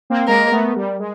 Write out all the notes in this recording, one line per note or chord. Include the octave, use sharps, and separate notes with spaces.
A#3 C4
G#3 A#3 A#4
A3 B3
G3
G#3